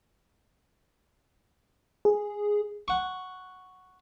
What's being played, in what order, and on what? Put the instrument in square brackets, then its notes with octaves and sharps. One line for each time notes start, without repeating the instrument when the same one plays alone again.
[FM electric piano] G#4
[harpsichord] F#5 C#6